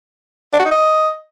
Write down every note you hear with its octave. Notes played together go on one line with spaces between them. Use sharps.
D4
F#4
D#4
D#5